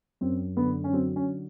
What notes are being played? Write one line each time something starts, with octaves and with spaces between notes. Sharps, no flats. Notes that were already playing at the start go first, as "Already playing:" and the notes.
F#2 C4
D3 B3
C#4
F#3 C4
C#4